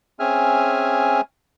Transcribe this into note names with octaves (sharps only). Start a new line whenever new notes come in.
C4 C#4 G#4 E5 G#5 F6